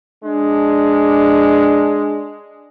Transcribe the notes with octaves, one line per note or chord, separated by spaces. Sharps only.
G#3 D4